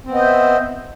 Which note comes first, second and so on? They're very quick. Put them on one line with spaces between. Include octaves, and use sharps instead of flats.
C4 B3 D#5 C5 E5